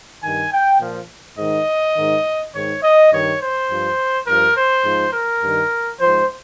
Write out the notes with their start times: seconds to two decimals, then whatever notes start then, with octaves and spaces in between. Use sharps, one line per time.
0.23 G2 D#3 G#5
0.52 G5
0.80 A#2 F3
1.38 G#2 D#3 D#5
1.96 G#2 D#3
2.54 G#2 D#3 C#5
2.83 D#5
3.12 G2 D#3 C#5
3.41 C5
3.70 G2 F3
4.27 G2 F3 A#4
4.56 C5
4.84 G#2 F3
5.13 A#4
5.42 G2 D#3
6.00 G#2 F3 C5